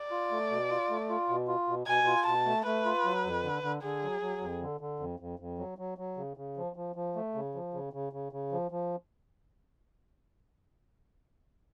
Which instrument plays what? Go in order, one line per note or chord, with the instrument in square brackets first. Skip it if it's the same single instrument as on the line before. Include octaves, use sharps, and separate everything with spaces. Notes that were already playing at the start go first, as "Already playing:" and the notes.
Already playing: [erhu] D5
[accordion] F4
A3
B2
F4
A3
F4
B2
F4
B2
[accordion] B2 [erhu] G#5
[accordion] F4
[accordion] B2 [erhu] A5
[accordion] A3
[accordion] A3 [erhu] B4
[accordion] F4
F#3
F2
D3
D3
[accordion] D3 [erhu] G#4
[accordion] F#3
F#3
F2
D3
D3
F2
F2
F2
F#3
F#3
F#3
C#3
C#3
F3
F3
F3
A3
C#3
F3
C#3
C#3
C#3
C#3
F3
F3